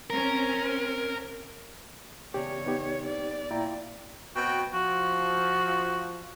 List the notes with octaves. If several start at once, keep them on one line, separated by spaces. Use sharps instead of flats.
C4 C#4 A#4
E2 C#3 G4 C#5 D5
B3 D#4 G4
C4 D5
A#2 E4 G5 A#5
B2 C4 F#4 G5
F3 F#4